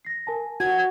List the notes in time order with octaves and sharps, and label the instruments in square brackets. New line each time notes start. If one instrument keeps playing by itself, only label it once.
[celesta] A#6 C7
A#4 G#5 A5
[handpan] F#4 [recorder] G#6